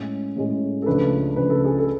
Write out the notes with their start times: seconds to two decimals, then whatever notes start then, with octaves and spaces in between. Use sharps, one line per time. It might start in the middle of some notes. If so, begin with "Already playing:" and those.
Already playing: A2 G#3 C#4
0.36 A2 G#3 C#4
0.82 A4
0.86 C#2 C#3 F3 A3 D4 B4
1.36 C#2 C#3 F3 A3 D4 B4
1.50 A4
1.64 G#4
1.78 A4